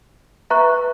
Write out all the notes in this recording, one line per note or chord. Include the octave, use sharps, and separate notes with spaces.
B4 E5 A#5 C#6 F#6